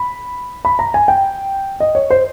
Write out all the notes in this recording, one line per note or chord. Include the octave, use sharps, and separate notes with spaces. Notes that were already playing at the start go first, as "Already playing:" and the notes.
Already playing: B5
B5
A#5
G#5
G5
D#5
C#5
C5